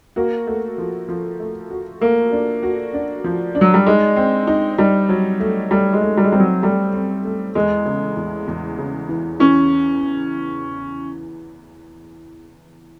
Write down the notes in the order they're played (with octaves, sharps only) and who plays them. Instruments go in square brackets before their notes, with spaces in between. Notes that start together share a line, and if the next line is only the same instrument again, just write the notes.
[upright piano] A#3 [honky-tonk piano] F#4
[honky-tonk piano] A3
F3
F3
A3
F#4
[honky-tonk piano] A3 [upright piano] A#3
[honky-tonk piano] D4
F#4
D4
F3
D4
[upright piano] F#3
G3
[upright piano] G#3 [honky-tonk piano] D#4
[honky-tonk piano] C4
D#4
[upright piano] G3 [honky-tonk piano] D#4
[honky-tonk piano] F#3
A3
[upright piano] G3 [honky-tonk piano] A3
[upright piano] G#3
[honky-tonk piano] A3
[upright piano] G3
G#3
[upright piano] G3 [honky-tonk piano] C4
[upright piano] F#3
[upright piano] G3 [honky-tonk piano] A3
[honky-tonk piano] C4
A3
[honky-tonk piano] E2 [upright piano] G#3
[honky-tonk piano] C#3
E2
E2
C#3
E3
[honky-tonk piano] E3 [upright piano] C#4